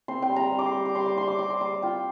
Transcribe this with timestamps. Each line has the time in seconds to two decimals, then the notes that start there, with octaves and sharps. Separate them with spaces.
0.08 C4 C6
0.22 G5
0.29 G3
0.36 A#5
0.52 G3
0.59 D6
0.66 C6
0.74 G3
0.86 D6
0.95 G3 C6
1.06 D6
1.17 G3 C6
1.28 D6
1.38 G3 D6
1.50 C6
1.61 G3 C6
1.82 F4 G5